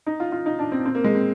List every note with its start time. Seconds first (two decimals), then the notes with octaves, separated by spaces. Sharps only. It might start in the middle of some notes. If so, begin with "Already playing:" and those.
0.06 D#4
0.20 F4
0.32 F4
0.46 D#4
0.59 D4
0.72 C4
0.86 C4
0.95 A#3
1.04 G#3
1.15 C4